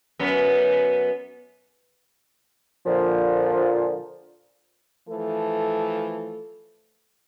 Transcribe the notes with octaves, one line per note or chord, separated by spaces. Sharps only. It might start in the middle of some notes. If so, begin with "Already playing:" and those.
F#2 B3
A#2 D3 F3
E3 F3 A3 A4